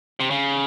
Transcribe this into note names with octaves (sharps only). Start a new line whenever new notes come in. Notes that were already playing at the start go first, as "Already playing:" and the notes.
C3
C#3